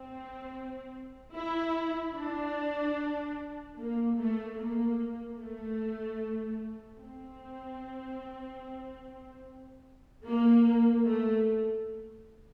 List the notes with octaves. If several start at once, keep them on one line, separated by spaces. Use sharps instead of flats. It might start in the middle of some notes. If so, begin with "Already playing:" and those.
Already playing: C4
E4
D4
A#3
A3
A#3
A3
C4
A#3
A3